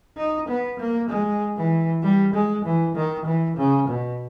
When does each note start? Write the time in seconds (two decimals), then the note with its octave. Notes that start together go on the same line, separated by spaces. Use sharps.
0.17 D#4
0.49 B3
0.80 A#3
1.10 G#3
1.56 E3
2.03 G3
2.34 G#3
2.65 E3
2.96 D#3
3.26 E3
3.57 C#3
3.88 B2